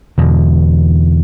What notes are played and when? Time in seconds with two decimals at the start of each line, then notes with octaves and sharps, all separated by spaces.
0.18 E2 B2 D3